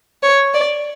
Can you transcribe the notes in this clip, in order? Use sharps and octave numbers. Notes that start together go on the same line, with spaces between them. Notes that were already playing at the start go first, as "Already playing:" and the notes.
C#5
D5